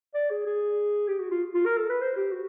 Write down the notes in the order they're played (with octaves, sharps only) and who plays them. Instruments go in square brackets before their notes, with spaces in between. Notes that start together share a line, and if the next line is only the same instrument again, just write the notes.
[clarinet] D5
G#4
G#4
G4
F#4
F4
F4
A#4
A4
B4
C5
G4
F#4